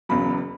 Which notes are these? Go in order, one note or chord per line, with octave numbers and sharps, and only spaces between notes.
E1 E2 C#3 F#3 B5